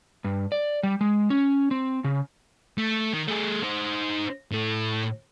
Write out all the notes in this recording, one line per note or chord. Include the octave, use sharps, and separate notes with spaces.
G2
D5
G3
G#3
C#4
C4
C#3
A3
D#3
A3 G#4
D#4 C5
A2 A3